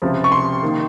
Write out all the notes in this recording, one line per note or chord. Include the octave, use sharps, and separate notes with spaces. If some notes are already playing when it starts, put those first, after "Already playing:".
C#2 C3 F3
C#6
C6
D#3 A#3